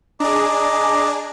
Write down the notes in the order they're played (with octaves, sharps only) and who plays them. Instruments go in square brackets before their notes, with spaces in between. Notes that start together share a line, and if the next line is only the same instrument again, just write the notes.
[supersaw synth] D4 G#4 [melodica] D#5 A#5 D6